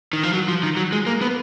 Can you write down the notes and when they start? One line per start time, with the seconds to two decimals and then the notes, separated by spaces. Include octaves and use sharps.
0.13 D#3
0.23 F3
0.33 F#3
0.48 F3
0.63 D#3
0.77 F#3
0.92 G#3
1.06 A#3
1.21 B3